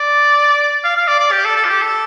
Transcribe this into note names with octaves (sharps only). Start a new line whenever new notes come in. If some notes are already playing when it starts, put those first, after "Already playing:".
Already playing: D5
F5
F5
D5
D5
G4
A4
A4
F4
G4
A4